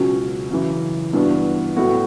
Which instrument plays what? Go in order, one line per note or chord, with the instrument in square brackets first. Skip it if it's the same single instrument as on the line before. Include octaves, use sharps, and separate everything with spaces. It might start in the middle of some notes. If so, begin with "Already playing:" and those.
Already playing: [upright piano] C#2 B2 F#3 C#4
F#2 C#3 E3
G2 E3 B3 D4 F#4
A2 F#3 B3 F#4